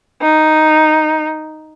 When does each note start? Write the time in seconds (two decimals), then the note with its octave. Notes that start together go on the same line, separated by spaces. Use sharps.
0.22 D#4